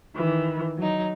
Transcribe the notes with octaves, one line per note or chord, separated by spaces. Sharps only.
D#3 E3
F#3 D#4